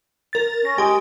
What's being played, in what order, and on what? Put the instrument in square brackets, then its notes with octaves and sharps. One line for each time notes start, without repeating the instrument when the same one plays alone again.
[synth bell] A#4 A6
[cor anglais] C#4 [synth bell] A#6
[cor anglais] G#3 [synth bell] G4 G#5